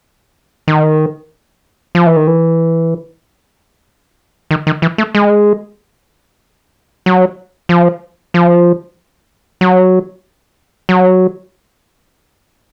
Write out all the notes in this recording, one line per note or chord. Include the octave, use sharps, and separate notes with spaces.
D#3
F3
E3
D#3
E3
D#3
D#3
E3
A3
G#3
F#3
F3
F3
F#3
F#3